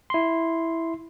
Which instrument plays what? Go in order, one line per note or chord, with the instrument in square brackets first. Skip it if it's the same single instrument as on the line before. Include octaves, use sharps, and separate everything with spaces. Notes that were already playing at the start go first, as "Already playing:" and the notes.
[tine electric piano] E4 C6